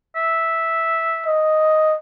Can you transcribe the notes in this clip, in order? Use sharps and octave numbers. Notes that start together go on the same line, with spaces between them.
E5
D#5